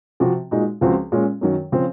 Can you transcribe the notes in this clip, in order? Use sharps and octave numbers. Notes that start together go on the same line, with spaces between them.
C3 F3 C4 F#4
A#2 G#3 D#4 F#4
C#2 C#3 F3 C4 F#4
A#2 G#3 C#4 F4
F#2 D#3 F#3
C#3 F3 C4